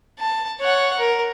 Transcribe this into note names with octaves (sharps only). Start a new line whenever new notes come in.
A5
C#5 F#5
A#4